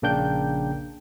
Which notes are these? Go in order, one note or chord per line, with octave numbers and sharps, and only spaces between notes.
A#1 C#3 A#3 D4 G5 G6